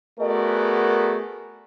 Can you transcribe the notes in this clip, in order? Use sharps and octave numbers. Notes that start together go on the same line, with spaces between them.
A3 B3 F#4 G#4 A#4 D5